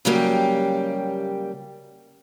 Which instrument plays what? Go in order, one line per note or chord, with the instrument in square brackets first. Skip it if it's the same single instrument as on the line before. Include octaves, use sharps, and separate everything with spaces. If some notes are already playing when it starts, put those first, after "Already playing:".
[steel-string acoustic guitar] C#3 F#3 G3 A#3 G4